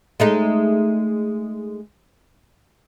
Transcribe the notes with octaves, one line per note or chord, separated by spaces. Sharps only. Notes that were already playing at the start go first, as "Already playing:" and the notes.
G#3 A3 D#4